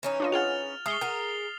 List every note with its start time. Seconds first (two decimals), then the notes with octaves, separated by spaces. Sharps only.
0.03 E3 C#4 D#4
0.20 D4 F4 D#5
0.32 F4 G#4 F#5 F6 A6 F7
0.86 G#3 E5 C#6 D#6 C7 G7
1.01 G#4 A#4 F#5